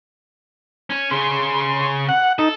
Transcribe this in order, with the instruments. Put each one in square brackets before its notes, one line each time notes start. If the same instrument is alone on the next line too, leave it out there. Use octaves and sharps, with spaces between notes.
[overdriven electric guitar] C#4
[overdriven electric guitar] C#3 C#4 [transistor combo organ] C6
[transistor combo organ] F#5
[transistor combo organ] D#4 [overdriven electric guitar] A4